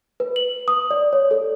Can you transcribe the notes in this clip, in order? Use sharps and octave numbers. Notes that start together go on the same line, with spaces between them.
B4
F#7
D#6
D5
C#5
A4